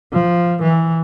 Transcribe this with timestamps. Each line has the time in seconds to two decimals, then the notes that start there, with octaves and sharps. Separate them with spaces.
0.13 F3
0.63 E3